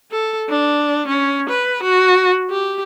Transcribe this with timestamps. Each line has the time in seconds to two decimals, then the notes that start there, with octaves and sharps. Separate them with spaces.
0.11 A4
0.49 D4
1.08 C#4
1.49 B4
1.83 F#4
2.50 G4